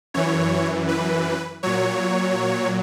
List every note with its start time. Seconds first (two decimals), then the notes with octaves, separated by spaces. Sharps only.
0.14 F#2 E3 C#5
0.88 B4
1.63 A#2 F#3 C#5